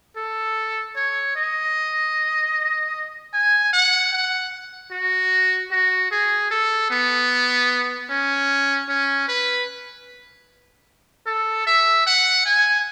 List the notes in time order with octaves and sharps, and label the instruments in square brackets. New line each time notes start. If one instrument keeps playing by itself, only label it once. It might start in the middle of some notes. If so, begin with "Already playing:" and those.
[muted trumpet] A4
C#5
D#5
G#5
F#5
F#5
F#4
F#4
G#4
A4
B3
C#4
C#4
B4
A4
E5
F#5
G#5